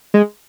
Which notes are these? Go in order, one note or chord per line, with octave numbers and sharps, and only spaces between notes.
G#3